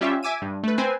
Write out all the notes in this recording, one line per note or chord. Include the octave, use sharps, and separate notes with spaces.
G3 C#4 F4 G4 E5
E5 G#5 D6 E6 D#7
G2
A3 B4
C4 B4 C5 G#5